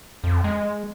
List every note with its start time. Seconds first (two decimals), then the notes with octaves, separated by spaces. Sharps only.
0.24 F2
0.44 G#3